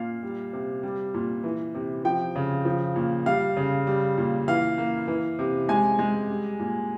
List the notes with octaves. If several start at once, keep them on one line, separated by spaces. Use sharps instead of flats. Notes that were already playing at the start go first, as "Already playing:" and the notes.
Already playing: A#2 F5
G3
C3
G3
A#2
E3
C3
F3 G5
C#3
F3
A#2
G3 F5
C#3
G3
A#2
E3 F5
A#3
E3
C3
G#3 G#5
G#3
G3
A#2